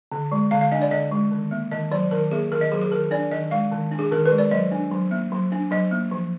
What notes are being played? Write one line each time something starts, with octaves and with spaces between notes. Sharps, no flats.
D3
G#3
D3 F5
F5
D4 D#5
D5
D3 D#5
G#3
D#3
A#3
D#3 D#5
F#3 D5
D#3 A#4
A#3 G#4
D#3 A#4
D#5
F#3 G#4
G#4
D#3 A#4
D4 D5
D#3 D#5
G#3 F5
D#3
D4
G#4
D#3 A#4
B4
G#3
D5
F#3 D#5
D4
F#3
A#3
F#3
D4
F#3 D#5
A#3
F3